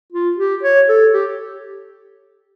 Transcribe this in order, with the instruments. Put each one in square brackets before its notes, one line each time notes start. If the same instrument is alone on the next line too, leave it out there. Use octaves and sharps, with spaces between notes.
[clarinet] F4
G4
C#5
A4
G4